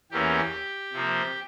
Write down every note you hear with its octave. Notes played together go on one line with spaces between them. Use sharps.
E2 E3 A#3 C#4 G4
C3 F3 A#3